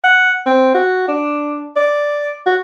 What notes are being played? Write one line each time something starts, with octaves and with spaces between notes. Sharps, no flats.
F#5
C4
F#4
D4
D5
F#4